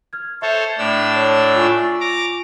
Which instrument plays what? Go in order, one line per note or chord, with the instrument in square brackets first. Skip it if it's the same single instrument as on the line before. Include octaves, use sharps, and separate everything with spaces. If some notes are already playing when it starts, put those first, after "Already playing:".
[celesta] F6 G#6
[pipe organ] A4 C5 C#5 [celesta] E5
[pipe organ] A2 D4 E6
[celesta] C#5 A5
F4 G#5 C#6
[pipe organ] A#5 D6